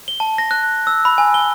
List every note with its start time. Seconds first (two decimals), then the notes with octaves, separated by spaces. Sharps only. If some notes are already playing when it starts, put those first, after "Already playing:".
0.08 G7
0.20 A5
0.38 A#6
0.51 F#6
0.87 E6
1.05 B5
1.18 G#5
1.34 G7